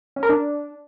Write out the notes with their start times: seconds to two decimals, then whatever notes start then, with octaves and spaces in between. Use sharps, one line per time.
0.16 C#4
0.23 A#4
0.29 D4